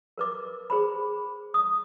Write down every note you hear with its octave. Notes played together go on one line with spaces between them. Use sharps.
A#4 B4 D6
G#4 C5 B5
D#6